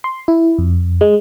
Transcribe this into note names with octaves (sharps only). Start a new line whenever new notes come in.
C6
E4
F2
G#3